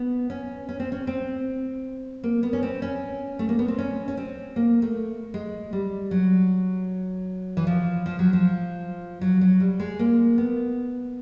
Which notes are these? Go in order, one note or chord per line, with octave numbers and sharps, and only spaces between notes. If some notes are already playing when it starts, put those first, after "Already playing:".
Already playing: B3
C#4
C#4
C4
C#4
C4
A#3
B3
C#4
C4
C#4
A3
A#3
B3
C4
C#4
C#4
C4
A#3
A3
G#3
G3
F#3
E3
F3
F3
F#3
F3
F#3
F#3
G3
G#3
A#3
B3